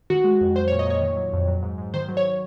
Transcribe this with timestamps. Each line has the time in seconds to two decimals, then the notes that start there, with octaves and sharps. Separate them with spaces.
0.10 D#3 F#4
0.24 G#3
0.41 F2
0.55 F#3 C5
0.68 C#5
0.71 A#2
0.79 D#5
0.86 A#2 C#5
1.01 D#3
1.16 F#3
1.33 F2
1.48 F#3
1.63 G#2
1.78 G#2
1.94 D#3 C5
2.09 F#3
2.17 C#5